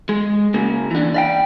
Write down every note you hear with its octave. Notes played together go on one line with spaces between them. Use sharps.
G#3
C#3 A#3
E3 D4
D5 F5 G5